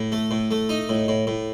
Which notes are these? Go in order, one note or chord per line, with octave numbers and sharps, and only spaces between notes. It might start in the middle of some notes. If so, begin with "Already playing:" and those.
Already playing: A2
A3
A2
A3
D#4
A2
A2
A2